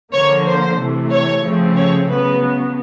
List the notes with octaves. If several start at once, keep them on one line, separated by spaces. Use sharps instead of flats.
D3 F3 A#3 C#5
C5
C3 E3 A3
C#5
C#3 F3 A3 C4
C#5
C#3 F#3 B3 B4